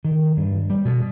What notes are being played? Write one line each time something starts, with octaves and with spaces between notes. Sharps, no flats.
D#3
G2
G3
B2